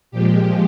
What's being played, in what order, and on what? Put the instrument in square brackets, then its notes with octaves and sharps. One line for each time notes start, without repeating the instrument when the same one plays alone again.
[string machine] A#2 F3 G#3 G4